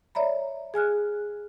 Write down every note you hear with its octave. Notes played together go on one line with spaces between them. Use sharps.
C#5 D5 E5 A#5 B5
G#4 G#5 F6 F#6